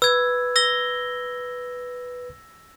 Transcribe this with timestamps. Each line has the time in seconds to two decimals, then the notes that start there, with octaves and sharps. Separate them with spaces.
0.02 B4 E6 G#6
0.56 E6 A#6 G7